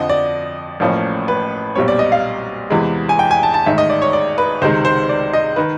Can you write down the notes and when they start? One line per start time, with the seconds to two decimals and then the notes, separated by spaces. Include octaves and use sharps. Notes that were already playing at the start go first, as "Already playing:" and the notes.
Already playing: F2 D3 F3 D#5
0.09 D5
0.80 A1 A2 F3 A#3 C#4
1.28 B4
1.75 B1 A#2 G3 C4 C#5
1.88 D5
1.99 D#5
2.12 F5
2.70 E2 C3 E3 G#3
3.09 G#5
3.19 G5
3.31 G#5
3.43 A5
3.54 A5
3.66 A1 G#2 D#3 E5
3.78 D#5
3.90 D5
4.02 C#5
4.13 D5
4.38 B4
4.62 C#2 C3 D#3 G#3 C5
4.85 C5
5.09 D5
5.33 D#5
5.56 D#3 B4